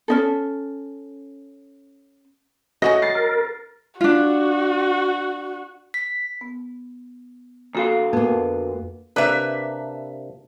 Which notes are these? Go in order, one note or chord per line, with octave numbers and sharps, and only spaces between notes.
C#4 D#4 A4
A3 C#4 F#4 D#5 A#6
A6 C7
A#4
D4 F4 F#4
B6
B3
D2 A#3 F#4 A4 F5
F2 A#3 B3
C3 A#3 D4 B4 E5